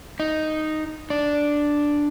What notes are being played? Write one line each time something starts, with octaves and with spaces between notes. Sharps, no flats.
D#4
D4